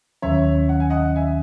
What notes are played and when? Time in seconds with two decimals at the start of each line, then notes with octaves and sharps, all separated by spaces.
0.22 D#2 D#3 F#3 C#4 C#5 E5
0.69 F#5
0.80 G#5
0.90 D#5 F#5
1.16 E5 G#5